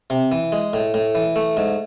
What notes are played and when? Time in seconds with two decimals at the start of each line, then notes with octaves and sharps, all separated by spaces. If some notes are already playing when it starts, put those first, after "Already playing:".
0.10 C3
0.32 E3
0.52 G#3
0.73 A2
0.94 A2
1.15 E3
1.36 A3
1.57 G#2